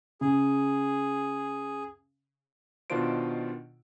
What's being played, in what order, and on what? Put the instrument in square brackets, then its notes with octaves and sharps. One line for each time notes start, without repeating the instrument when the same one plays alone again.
[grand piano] C#3 [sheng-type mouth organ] G#4
[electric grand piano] B2 D#3 D4 F4 C5 D7